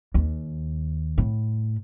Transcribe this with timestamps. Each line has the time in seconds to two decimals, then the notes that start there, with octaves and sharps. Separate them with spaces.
0.14 D#2
1.18 A2